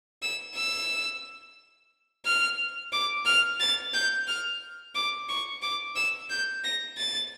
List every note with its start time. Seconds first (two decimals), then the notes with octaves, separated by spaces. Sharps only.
0.22 E6
0.55 E6
2.25 F6
2.92 D6
3.25 F6
3.60 A6
3.94 G6
4.27 F6
4.95 D6
5.29 C#6
5.62 D6
5.96 E6
6.30 G6
6.64 A#6
6.97 A6